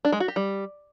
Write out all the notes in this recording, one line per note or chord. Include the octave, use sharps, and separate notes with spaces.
D4
G#3
F#4
G4
G3